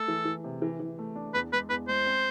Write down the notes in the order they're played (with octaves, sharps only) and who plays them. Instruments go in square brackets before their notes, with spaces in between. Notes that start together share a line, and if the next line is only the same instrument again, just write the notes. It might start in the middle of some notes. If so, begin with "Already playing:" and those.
Already playing: [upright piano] A3 [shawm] A4
[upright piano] E3
E3
C3
E3
E3
A3
D4
[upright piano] E2 [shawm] B4
[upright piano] G#3 [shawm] B4
[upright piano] E2 [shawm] B4
[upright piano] G#3 [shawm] C5
[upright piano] C4